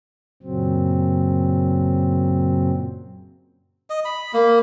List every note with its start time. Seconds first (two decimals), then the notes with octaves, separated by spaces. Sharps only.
0.43 F#2 A#2 C#3 F#3 C4
3.90 D#5
4.05 B5
4.33 A#3